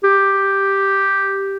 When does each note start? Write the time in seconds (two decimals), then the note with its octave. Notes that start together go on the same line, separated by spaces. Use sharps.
0.04 G4